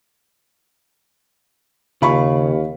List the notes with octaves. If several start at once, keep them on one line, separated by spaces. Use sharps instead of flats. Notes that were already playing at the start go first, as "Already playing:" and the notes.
D#2 C#3 F4 B5 C#6